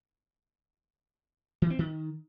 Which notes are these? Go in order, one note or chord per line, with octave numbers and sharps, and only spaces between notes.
E3
C4
D#3